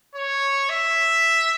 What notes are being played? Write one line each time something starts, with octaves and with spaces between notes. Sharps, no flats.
C#5
E5